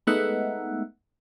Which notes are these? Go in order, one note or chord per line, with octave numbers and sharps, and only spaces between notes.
G#3 A3 B3 D#4 E5 F#5